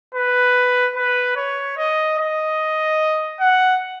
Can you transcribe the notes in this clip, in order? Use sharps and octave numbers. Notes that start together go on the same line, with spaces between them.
B4
B4
C#5
D#5
D#5
F#5